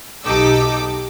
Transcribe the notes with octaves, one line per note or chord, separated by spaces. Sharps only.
B1 D#4 G4 A4 D6 E6